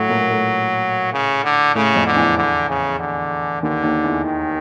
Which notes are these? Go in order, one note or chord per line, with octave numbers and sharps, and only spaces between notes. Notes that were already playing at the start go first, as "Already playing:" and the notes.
Already playing: A2 F#3 A3
A#2 A#3
A#3
A2 A3
C#3
D3
A2 C#3 A3
F2 F3
D3
E2 E3
D3
C#3
D3
D#2 D3 D#3
D#2 D#3
E2 E3
D#3